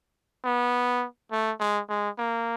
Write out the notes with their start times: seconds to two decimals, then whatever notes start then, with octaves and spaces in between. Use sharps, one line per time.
0.44 B3
1.31 A3
1.60 G#3
1.89 G#3
2.18 A#3